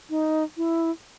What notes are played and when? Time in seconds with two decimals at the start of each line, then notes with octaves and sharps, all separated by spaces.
0.10 D#4
0.57 E4